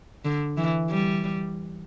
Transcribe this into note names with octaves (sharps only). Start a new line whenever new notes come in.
D3
E3
G3